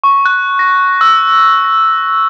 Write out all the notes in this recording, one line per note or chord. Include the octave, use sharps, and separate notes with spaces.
C#6
F#6
A#6
E6
A#6